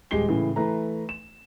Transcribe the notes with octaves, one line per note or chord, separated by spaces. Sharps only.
D#1 G#3 G4 C7 G7
A2 C#3 E3
E3 A3 B4 A#5
E7